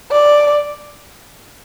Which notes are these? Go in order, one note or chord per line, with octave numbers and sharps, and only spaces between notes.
D5